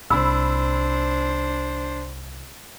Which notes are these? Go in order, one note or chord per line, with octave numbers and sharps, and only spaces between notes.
C2 D4 C5 B5 E6